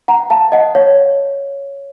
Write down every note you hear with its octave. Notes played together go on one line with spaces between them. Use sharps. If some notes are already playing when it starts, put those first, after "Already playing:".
F#5 A#5
F5 A5
D#5 F#5
C#5 F5